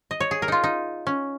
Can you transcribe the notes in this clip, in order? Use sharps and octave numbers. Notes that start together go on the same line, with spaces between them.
D#5
C#5
G#4
A#4
D#4 F4
D#4
C#4